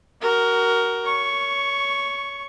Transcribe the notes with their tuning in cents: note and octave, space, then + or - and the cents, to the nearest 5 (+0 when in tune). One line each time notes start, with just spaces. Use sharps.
F#4 +30 A#4 +0
C#5 +20 C#6 +0